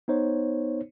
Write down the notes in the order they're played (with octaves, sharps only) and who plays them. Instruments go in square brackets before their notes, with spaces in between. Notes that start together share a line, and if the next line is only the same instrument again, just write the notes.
[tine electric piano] B3 D#4 C5 C#5